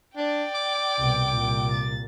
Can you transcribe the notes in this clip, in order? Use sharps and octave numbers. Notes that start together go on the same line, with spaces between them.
D4 D5 G5
D6
C2 B2
C2 A#2
A6